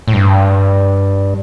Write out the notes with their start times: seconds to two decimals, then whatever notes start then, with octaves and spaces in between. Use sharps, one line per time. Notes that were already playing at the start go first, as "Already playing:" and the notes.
0.08 A2
0.14 G2